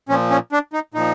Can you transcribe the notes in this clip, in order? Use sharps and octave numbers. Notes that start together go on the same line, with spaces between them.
A#2 F3 C#4
C#4
D4
D#4
A#2 F3 D#4